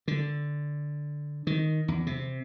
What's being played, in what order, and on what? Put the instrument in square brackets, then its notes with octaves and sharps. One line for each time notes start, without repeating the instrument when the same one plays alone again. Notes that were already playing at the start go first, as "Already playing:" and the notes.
[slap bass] D3
D#3
E2
C3